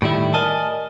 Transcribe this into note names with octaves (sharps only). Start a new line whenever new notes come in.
A2 D#3 G3 E4
A#4 D5 D#5 G#5 A5